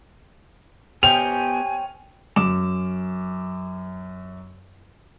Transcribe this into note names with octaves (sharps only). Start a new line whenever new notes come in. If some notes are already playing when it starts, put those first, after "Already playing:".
B3 G4 C5 C#5 G5 G#5 F7
F#2 D6 E7